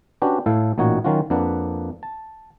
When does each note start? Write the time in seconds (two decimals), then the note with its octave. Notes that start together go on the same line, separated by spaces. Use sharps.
0.22 C#4 D4 F#4 G4 B4
0.46 A2 E4 A4 F5
0.78 A1 A#2 D#4 F#4 C#5 F#5
1.04 D#3 F#3 C#4 F4 F#4
1.30 F2 A#3 D4 B4 F#5
2.03 A5